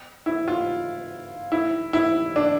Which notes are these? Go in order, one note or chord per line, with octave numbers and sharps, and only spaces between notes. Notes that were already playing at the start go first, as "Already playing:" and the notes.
E4
F4
E4
E4
D4